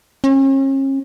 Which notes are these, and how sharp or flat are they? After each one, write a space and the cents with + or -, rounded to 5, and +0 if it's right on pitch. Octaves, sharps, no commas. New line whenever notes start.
C#4 -40